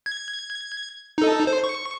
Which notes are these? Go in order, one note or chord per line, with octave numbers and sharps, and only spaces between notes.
G#6
D#4 A4
C5
C#6